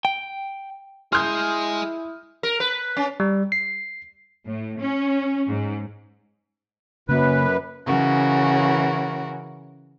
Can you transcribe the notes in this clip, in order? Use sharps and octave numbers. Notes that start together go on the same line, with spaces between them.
G5
G#3 E4 G#4 C6 D#6 F6 G6
A#4
B4
C#4
G3
C7
A2
C#4
G#2
F#2 C#3 A#3 B4
C#3 E3 C#4 F#4 A#4